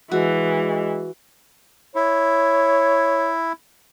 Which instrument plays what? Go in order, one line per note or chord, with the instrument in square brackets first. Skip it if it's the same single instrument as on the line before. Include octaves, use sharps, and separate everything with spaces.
[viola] E3 [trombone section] G#3 [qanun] F#4
[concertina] E4 [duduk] C#5